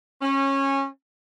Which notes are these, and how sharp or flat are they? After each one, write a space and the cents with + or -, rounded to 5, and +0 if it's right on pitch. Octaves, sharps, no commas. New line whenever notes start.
C#4 -20